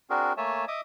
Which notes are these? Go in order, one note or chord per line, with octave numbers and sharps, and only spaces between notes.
C4 D4 F#4 G#4 A#4
A3 A#3 C#5 E5 G#5 A5
D#5 E5 D6 D#6